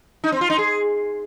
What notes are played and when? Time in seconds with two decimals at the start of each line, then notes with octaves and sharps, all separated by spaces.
0.24 D#4
0.32 C4
0.41 F4
0.50 D#4
0.58 G#4